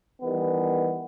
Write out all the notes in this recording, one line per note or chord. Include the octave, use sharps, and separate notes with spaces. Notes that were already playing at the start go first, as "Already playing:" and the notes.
D#3 E3 G3 B3